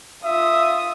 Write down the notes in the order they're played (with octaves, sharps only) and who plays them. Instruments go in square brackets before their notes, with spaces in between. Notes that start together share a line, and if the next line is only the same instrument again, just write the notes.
[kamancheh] F4 D#6 [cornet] E5